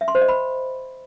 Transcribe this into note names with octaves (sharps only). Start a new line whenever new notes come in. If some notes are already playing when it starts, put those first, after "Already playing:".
E5
C6
C5
D#5
B5